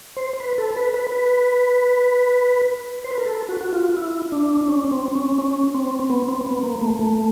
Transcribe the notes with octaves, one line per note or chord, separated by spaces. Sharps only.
C5
B4
A4
B4
B4
B4
C5
B4
A#4
A4
F#4
F#4
F4
E4
D4
D4
C#4
C4
C#4
C#4
C4
B3
C4
B3
A#3
A3
A#3
A3